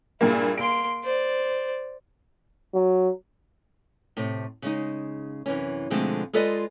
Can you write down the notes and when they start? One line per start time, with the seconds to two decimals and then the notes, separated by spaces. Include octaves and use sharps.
0.21 G2 A#2 A#3 E4 G#4
0.58 A#3 C6 D7
1.03 C5 D5
2.74 F#3
4.17 A2 C3
4.62 C#3 G#3 D#4
5.46 F#2 C3 E3 C#4
5.90 B2 D3 F3 G#3 A3 C4
6.33 G#3 F4 A4 B4 D5 D#5